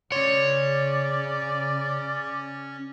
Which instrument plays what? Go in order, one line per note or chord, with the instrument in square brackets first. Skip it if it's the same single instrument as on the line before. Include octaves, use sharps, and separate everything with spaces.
[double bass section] C#3 [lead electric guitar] C#4 C6 [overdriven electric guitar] C#5 [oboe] D5